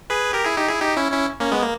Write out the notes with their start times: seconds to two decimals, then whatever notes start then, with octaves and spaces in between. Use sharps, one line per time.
0.10 G#4 B4
0.33 G4 A#4
0.45 E4 G#4
0.57 D#4 G4
0.69 E4 G#4
0.80 D#4 G4
0.97 C#4 E4
1.12 C#4 E4
1.40 A#3 C#4
1.52 G#3 B3
1.63 A#3